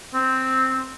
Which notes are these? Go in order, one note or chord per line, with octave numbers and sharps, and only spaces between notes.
C4